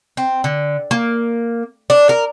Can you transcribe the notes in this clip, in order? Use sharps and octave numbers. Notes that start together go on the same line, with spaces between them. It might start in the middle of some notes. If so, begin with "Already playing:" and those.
C4
D3
A#3
D4
A#4